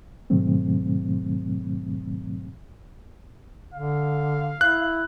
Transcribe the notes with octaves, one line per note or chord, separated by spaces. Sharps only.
G#2 B2 D#3 F#3 A3 C4
D3 F5
E4 F#6